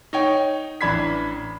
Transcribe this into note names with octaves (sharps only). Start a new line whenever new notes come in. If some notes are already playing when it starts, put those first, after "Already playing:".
D#4 C#5 G5
A1 E3 D4 B5 G#6 B6